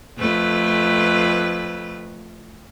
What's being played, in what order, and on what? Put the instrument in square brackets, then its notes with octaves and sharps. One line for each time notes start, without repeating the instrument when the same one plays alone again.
[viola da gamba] F2 A3 B4